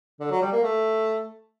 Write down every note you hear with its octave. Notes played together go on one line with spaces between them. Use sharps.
D3
F#3
G3
A#3
A3